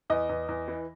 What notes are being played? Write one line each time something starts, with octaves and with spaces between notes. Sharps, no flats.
E2 D#5
E2
E2
E3